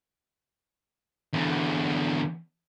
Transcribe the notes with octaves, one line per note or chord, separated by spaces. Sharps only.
E2 D3